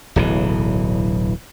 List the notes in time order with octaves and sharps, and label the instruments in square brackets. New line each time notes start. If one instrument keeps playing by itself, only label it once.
[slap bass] D1 B1 E3